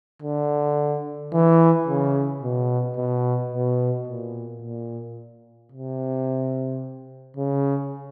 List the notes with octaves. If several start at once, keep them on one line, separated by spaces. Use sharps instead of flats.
D3
E3
C#3
B2
B2
B2
A#2
A#2
C3
C#3